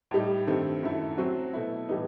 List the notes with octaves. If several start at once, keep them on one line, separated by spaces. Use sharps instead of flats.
A2 G3 D#4
G2 D#3 A3 C4
F#2 D#3 A3 E4 A4
F#3 C4 F#4
B2 A3 E4
A2 E3 G3 B3 D#4